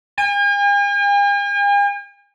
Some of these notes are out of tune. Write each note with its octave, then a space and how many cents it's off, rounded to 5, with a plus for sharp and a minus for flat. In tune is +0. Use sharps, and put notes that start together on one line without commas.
G#5 -45